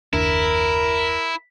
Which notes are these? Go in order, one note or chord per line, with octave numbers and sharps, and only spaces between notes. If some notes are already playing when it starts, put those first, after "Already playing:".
F#1 D#2 D4 E4 A#4